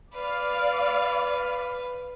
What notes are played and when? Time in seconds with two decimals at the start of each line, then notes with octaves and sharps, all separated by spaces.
0.14 B4 D5 F5